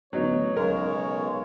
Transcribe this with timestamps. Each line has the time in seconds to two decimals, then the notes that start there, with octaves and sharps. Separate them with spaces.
0.13 A1 D2 F#3 B3 D#4 C#5
0.57 B1 C#3 G#3 A#4